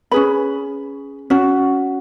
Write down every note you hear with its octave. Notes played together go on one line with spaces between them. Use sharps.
C#4 G#4 B4 B5
C#4 F#4